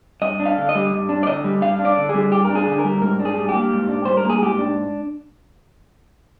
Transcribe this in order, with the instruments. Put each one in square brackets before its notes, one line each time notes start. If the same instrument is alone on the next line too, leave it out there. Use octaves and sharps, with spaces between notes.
[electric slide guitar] G2 D#5
D4
F5
D3
D#5
G3
G2
D4
D5
D3 D#5
G3
G2 F5
D4
D5
D3
G#4
G3
G2 G4
A#4
D4
G#4
D3
A#4
G3
G#2 A#4
D4
G#4
G3
G4
A#3
G#2
D4
G3 C5
A#4
A#3 G#4
G#2 G4
D4